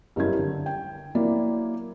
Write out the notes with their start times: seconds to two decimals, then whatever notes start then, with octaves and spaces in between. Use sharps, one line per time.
0.16 F#1 G2 C#3 E4 G#6
0.39 D3
0.66 G5
1.15 F#3 A#3 E4 D5